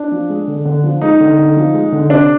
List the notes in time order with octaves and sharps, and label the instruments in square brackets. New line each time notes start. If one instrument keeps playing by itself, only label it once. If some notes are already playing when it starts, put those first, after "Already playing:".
Already playing: [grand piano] D4
F3
G#3
D3
D3
F3
G#3 D#4
D3
D3
F3
G#3
D3
C3 D4